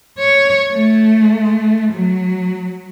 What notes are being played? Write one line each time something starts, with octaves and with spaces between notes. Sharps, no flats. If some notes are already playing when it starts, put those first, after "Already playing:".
C#5
A3
F#3